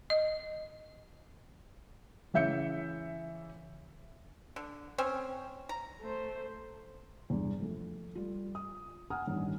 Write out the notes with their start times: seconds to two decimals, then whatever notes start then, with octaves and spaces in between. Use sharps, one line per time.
0.10 D#5
2.34 C#3 E3 E5 G6 C#7
4.56 D3
4.98 C4 C#4
5.69 A#5
6.01 A3 C5
7.30 E2 G2
7.58 F3 A3
8.15 G3 F4
8.55 D#6
9.10 F#5 G#5 A#5 D#6 F6
9.27 A1 G2 D#3